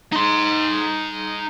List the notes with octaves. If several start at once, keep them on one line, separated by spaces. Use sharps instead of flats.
D#4 C6